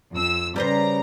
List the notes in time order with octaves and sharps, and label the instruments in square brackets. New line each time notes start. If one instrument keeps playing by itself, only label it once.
[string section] F2 E6
[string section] C#3 A#5 [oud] G3 B4 C5